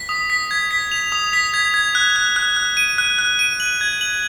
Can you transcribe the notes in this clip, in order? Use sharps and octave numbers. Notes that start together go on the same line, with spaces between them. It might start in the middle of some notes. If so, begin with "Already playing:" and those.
Already playing: B6
D#6
B6
G#6
B6
F7
D#6
B6
G#6
G#6
F#6
F#6
F#6
F#6
D#7
F#6
F#6
D#7
F#7
G#6
F#7